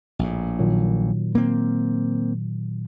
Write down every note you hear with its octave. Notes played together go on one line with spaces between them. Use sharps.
A#1 A2
A#2 D#3 F#3
A#3 C4